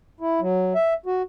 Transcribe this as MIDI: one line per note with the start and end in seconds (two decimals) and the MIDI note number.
0.20 0.40 64
0.41 0.73 54
0.75 0.94 76
1.06 1.22 66